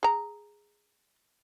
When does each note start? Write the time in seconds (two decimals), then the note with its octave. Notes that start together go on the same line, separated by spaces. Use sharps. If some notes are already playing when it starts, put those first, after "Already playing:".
0.03 G#4 A#5